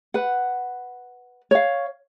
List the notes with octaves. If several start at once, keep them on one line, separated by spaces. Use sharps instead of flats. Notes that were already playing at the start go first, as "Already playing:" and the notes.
B4 F#5
C#5 F5